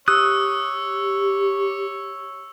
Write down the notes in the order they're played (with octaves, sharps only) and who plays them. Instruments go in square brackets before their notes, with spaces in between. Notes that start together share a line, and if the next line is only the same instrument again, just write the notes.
[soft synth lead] G4 [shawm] C#5 [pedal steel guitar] D#6 F#6 [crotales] E6